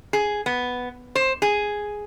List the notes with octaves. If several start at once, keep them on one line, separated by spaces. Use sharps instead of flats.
G#4
B3
C5
G#4